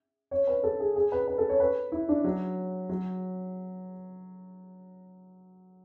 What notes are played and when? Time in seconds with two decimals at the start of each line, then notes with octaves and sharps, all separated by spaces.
0.31 C#5
0.47 B4
0.63 A4
0.80 G#4
0.96 G#4
1.12 B4
1.28 B4
1.38 A4
1.49 C#5
1.60 B4
1.92 E4
2.09 D4
2.24 F#3
2.89 F#3